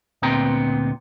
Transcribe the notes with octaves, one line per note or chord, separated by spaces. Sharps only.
D2 A#2 B3 C4 G5 A#5